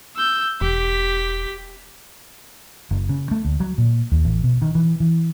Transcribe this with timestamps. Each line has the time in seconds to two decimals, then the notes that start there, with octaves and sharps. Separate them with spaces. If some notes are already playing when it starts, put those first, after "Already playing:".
0.16 E6 G6
0.61 E1 G4 B6
2.91 F#1
3.09 C#3
3.31 A3
3.45 D2
3.60 F#3
3.78 A#2
4.12 D#2
4.25 A1
4.43 B2
4.62 D#3
4.75 E3
5.00 E3